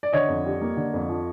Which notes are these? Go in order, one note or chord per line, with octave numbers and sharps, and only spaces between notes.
D5
D3 C#5 D#5
F2
G3
A#3
D3
F2
F3